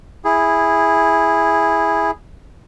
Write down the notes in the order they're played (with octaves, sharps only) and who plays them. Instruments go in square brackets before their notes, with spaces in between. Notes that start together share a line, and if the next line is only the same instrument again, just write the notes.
[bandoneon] E4 G#4